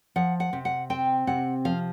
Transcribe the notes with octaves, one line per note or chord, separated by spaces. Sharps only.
F3 F#5
F#5
C3
F#5
C4 G5
C3 F#5
F3 F5